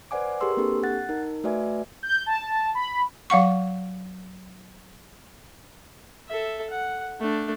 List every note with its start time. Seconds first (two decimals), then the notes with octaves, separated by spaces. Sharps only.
0.11 B4 C5 D5 F#5 G#5 D6
0.41 G4 G#4 A#4 B4 C6 E6
0.57 A#3 C4 D4 G4 A4
0.83 F#5 F#6 A6
1.09 D#4 A#4
1.44 A3 F#4 B4 D5 E5 G#5
2.03 G6
2.26 A5
2.75 B5
3.30 F#3 F5 F#5 C#6
6.28 A4 E5
6.71 F#5
7.20 A3 D4